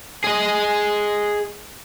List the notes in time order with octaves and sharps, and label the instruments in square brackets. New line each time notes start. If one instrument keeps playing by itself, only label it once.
[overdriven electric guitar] G#4 D#5